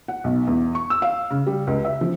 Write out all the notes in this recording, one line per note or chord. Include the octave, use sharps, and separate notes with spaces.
F#5
B1
E2
C#6
E6
F5
C#3
G3
C#2
E5
F3